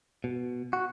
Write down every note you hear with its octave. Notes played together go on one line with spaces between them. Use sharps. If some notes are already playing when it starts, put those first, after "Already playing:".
B2
F#4